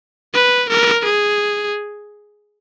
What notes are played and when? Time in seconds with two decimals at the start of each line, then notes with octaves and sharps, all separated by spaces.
0.34 B4
0.69 A#4
1.05 G#4